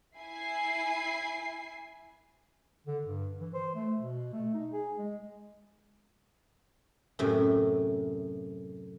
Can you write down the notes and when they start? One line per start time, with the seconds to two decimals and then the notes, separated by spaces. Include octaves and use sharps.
0.18 E4 G#5 C7
2.87 D3
3.05 G2
3.40 E3
3.54 C5
3.75 A3
3.99 B2
4.33 A3
4.54 D#4
4.72 G#4
4.98 G#3
7.19 F#2 A2 C3